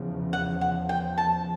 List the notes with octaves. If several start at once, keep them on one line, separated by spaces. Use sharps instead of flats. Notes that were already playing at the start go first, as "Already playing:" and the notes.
Already playing: E2 C#3 F3
F#5
F#5
G5
A5